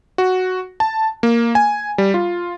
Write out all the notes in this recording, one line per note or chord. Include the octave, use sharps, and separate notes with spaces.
F#4
A5
A#3
G#5
G3
F4